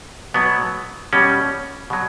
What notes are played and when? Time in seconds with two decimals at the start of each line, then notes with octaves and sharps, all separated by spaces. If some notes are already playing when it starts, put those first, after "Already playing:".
0.34 B2 F#3 B3
1.13 B2 G3 C#4
1.90 B2 F#3